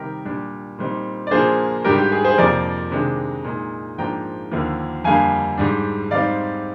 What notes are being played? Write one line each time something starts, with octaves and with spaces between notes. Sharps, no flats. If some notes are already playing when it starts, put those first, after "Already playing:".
Already playing: C3 D#3 G3 G4 A#4
A#2 G3 D4
A#2 G3 C4 D#4
D5
A#2 F3 A#3 D4 G#4 C5
G#2 G3 D4 G4 A#4
G4
G#4
G#4 C5
F2 C3 F3 A#3 A#4 D5
C3 D#3 G#3 D4
A#2 G#3 D#4
G#2 F3 A#3 D4 G5 A#5
D#2 D3 F3 A#3
F2 D3 G3 A#3 F5 G#5
G#2 G3 D4
G#2 G3 C4 D#4 D5 F5